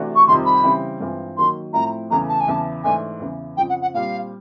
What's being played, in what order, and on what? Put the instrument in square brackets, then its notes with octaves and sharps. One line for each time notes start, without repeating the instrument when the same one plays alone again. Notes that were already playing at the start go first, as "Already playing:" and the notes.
Already playing: [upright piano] C3 E3 A3 D4 F#4
[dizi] C#6
[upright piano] F2 C3 D#3 G3 [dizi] C6
[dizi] B5
[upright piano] C#3 E3 G3 C4 E4
G2 E3 G#3 C4 F4
[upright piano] D#3 F#3 A#3 [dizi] C6
[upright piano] A2 F3 A3 C4 E4 [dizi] A#5
[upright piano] E2 C#3 E3 A3 [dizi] A#5
[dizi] A5
G#5
[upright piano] E2 C#3 E3 [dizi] A5
[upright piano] G#2 E3 A3 D4 [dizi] G#5
[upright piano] E2 C#3 E3
[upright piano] F2 C#3 F3 [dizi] G5
[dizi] F#5
F#5
[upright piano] A#2 G3 C4 [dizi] F5